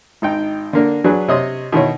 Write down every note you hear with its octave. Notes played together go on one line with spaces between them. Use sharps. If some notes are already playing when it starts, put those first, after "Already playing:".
G#1 D#4 G5
D3 A#3 D4
F#3 D4 F#4 G#4 B4
C3 C#5 D#5 D#6
B2 D#3 E4 C#5